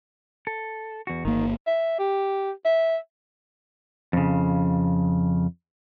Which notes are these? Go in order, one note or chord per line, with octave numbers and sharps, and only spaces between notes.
A4
E2 F#4
G1 D#3 A#3
E5
G4
E5
F2 C#3